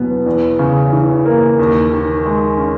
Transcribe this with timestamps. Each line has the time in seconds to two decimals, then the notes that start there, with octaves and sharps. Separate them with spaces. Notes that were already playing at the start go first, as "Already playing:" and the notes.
Already playing: E2 B2 F#3 B3
0.26 E2
0.59 C#3
0.93 E3
1.25 A#3
1.59 D#2
1.93 D#3
2.26 G#3
2.58 C#4